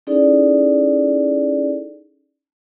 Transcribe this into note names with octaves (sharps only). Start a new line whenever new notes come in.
C#4 D#4 E4 G#4 A4 D5